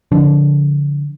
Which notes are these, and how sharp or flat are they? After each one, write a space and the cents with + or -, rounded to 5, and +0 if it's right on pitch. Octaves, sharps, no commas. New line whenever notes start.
D3 -30 F3 +0 D4 -25